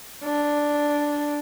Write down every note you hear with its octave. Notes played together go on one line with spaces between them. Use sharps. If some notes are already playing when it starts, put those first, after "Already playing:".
D4